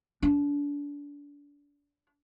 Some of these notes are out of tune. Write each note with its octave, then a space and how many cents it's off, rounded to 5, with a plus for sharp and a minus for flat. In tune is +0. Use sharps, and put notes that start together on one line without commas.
D4 -30